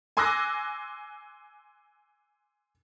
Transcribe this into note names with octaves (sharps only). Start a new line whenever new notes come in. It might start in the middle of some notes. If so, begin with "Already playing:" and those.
G#5 C6 D6 E6 F#6 A#6